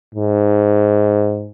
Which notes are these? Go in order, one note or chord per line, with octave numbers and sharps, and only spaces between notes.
G#2